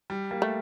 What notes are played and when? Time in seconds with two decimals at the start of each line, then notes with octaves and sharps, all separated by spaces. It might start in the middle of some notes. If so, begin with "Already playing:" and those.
0.10 G3
0.31 G3 A#3
0.42 A3